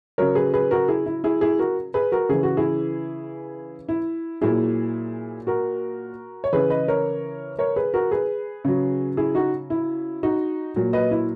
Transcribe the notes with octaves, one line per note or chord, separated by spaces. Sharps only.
C#3 F#3 A#4 C#5
G#4 B4
G#4 B4
F#4 A#4
E4 G#4
E4
E4 G#4
E4 G#4
F#4 A#4
G#4 B4
F#4 A#4
C#3 E3 G#4
F#4
E4 G#4
E4
A#2 F#3 E4 G#4
F#4 A#4
C#5
C#3 E3 G#4 B4
B4 D#5
A#4 C#5
A#4 C#5
G#4 B4
F#4 A#4
G#4 B4
C#3 F#3
E4 G#4
D#4 F#4
E4
D#4 F#4
A#2 F#3
B4 D#5
E4